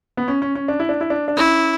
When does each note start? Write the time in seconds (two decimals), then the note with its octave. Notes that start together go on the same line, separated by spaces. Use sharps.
0.17 B3
0.28 C#4
0.42 C#4
0.55 C#4
0.68 D4
0.80 E4
0.89 D4
1.01 E4
1.10 D4
1.28 D4
1.36 C#4 E4